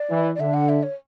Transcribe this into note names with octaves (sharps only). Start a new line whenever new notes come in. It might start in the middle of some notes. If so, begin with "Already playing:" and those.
Already playing: D5
E3
D5
D3 E5
F#5
E5
C#5